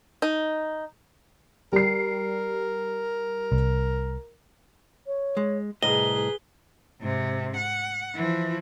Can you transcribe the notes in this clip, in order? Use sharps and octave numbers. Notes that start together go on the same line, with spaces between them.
D#4
G3 A#4 C7
C2
C#5
G#3
C2 A2 G#4 B4 D#5 A#5 G7
G#2 C3
F#5
E3 F3